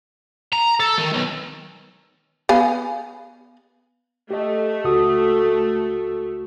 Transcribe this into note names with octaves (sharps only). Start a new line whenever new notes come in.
A#5
A4
D#3
B1
B3 F5 G#5
A3 G4 D#5
C#2 F#4 D#6